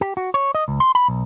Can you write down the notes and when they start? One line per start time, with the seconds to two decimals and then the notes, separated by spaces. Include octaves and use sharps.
0.01 G4
0.17 F#4
0.34 C#5
0.55 D#5
0.68 C#2
0.80 C6
0.95 B5
1.08 B1